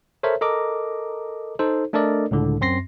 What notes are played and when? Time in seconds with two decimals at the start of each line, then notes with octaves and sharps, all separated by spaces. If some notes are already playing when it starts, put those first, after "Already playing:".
0.23 A4 A#4 C5 C#5 E5
0.41 A4 A#4 D#5 A#5 D6
1.59 D#4 A4 C5
1.93 A3 D4 A4 A#4 D5 D#5
2.31 C#2 A2 D3
2.61 F#2 C4 C6 A#6 C7